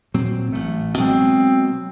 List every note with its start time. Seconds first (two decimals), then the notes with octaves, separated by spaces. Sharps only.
0.14 A#2 F#3 C4
0.52 A1 A3
0.97 B2 F#3 G#3 C4